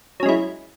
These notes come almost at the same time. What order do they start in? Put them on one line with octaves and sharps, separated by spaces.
F#3 C#4 G#3 E4